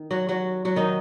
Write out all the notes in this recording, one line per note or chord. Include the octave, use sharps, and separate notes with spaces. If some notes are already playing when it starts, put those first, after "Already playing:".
Already playing: D#3
F#3 F#4
F#3 F#4
F#3 F#4
D#3 D#4